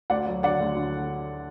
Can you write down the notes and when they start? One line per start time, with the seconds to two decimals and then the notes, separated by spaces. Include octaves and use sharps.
0.10 D2 D5 F#5
0.27 F#3
0.43 D3 D5 F#5
0.60 D2
0.76 D3